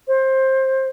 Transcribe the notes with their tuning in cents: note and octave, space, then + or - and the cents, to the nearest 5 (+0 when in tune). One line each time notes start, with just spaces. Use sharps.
C5 +20